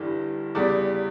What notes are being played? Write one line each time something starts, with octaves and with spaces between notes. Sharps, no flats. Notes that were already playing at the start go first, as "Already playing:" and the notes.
Already playing: G1 G2 E3 G3
E2 C#3 G3 D5